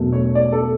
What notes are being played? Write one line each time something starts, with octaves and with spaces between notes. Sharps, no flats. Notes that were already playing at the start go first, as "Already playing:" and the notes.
Already playing: E1 E2 B2 F#3 A3
C#5
D5
A4